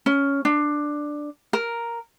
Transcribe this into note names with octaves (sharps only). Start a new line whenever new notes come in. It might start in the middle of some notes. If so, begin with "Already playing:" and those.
C#4
D4
A#4